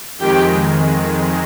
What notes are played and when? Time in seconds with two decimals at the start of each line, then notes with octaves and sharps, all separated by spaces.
0.18 F2 D#3 G#3 G4 G5